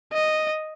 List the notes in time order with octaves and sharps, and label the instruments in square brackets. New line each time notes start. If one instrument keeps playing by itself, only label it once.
[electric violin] D#5